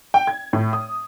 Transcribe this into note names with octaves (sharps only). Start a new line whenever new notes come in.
G5
G#6
A2
D#6